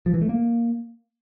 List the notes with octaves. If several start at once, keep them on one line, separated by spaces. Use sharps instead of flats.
F3
E3
A3
A#3